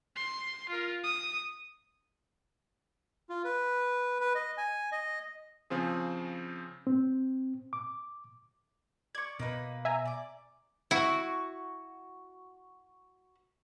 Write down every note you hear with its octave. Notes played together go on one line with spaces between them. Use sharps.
C6
F4 A#4
D#6
F4
B4
B4
D#5
G#5
D#5
C#3 F3 C4 G#4
C4
D6
D5 C#6 G#6
B2 A#3 D#4 B4
E5 G#5 A#5
D5 D6
E4 F#4